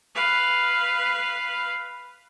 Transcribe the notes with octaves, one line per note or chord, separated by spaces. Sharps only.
B4 F5